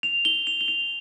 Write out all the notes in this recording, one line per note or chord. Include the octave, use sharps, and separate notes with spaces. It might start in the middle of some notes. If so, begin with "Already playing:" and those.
F7
G7
F7
G7
F7